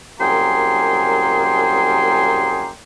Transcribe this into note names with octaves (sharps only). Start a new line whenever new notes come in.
C2 F#2 A#3 G#4 G5 C6